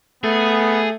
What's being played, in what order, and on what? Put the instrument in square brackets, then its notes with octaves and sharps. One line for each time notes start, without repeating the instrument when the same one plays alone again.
[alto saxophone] A3 [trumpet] B3 [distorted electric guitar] G#4